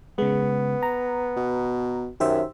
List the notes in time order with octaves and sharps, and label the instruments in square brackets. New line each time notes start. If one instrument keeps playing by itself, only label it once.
[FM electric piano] C#3 G#3 [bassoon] B3
[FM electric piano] A#5
[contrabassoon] B2
[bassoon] F#2 [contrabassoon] D#3 [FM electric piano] G4 C5 E5